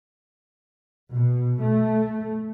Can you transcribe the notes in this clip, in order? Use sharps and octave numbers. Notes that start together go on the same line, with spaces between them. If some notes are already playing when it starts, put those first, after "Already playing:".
B2
A3